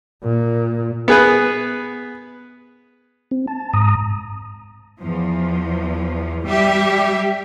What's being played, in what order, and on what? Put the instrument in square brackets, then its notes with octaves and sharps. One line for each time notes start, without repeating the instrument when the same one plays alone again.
[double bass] A#2
[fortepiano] B3 G#4 B4
[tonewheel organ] C4
A5
G#2 A#5 D#6
[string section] E2 F3
G3 G4 E5